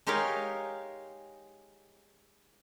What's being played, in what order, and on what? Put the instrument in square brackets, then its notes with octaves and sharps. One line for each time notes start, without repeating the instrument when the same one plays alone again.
[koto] G#3 D#4 G4 A#4 C#5 F5